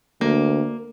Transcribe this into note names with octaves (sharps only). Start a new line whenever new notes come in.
D2 A#3